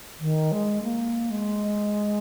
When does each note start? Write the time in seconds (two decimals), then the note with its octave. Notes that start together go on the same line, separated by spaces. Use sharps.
0.20 D#3
0.52 G#3
0.83 A#3
1.30 G#3